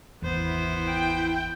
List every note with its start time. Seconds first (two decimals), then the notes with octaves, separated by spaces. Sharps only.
0.22 G#1 E2 B3 E4 C5
0.86 G5